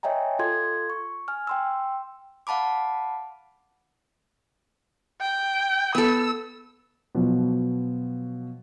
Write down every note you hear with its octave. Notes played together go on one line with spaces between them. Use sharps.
C#5 D#5 E5 G5 G#5 A#5
F4 A4 C6 G#6
C#6
G#5 F6
G5 C6 E6
F5 F#5 A5 B5 D6
G5
B3 A4 E6
B2 F3 F#3